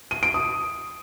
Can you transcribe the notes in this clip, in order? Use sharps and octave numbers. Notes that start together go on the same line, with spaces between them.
D#7
D7
D#6